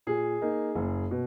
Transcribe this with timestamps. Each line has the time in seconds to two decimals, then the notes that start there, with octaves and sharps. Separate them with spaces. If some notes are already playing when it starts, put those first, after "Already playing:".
0.07 A#2 G#4
0.42 A#3 D#4
0.75 F#1
1.11 B2